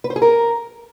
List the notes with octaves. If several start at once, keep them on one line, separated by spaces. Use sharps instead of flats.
B4
C5
G#4
A#4